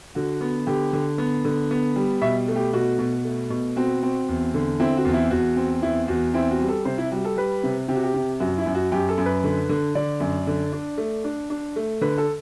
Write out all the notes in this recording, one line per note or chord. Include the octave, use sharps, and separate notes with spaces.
D3 F#4
B3
D3 G4
D3
B3
D3
B3
G3
B2 E5
A3
G4
B2 F#4
B2
A3
B2
C4 F#4
C4
E2
D3
C4 E4
F#4
E2
E4
E2 F#4
C4
E2 E4
E2 F#4
C4 E4
F#4
G3
A4
C3 C5
E4
G3 F#4
A4
G3 B4
C3
C3 G4
F#4
G4
C3
F#2 F#4
E4
F#2
F#4
F#2 G4
A4
F#2
B4
D3
D3
D3 D5
F#2
D3
D4
A3
D4
D4
A3
D3 B4
A4